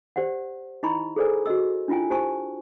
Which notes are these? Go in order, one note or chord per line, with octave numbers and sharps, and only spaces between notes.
G4 C5 D5 F#5
D#4 E4 D#5 A#5 B5 C#6
G#4 A4 C5 D5 G#5
F#4 A#4 D#5 E6
D4 E4 F4 G5 G#5
G4 C5 G#5 A5 C#6